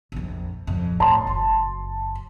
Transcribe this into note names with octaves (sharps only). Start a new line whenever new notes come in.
A#1 F2
F2 A#2
A2 A5 C6
F#1 F#2